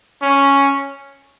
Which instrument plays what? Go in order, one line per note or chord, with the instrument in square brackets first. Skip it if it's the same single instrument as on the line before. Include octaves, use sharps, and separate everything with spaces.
[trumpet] C#4